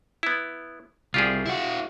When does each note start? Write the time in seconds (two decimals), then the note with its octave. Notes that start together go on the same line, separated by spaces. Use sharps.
0.23 B3 E4
1.14 C2 F4 G4 G#4
1.46 E4 F#4